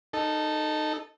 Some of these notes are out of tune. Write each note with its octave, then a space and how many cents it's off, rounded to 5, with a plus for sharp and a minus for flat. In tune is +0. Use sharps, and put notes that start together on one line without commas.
D#4 -15 A4 +0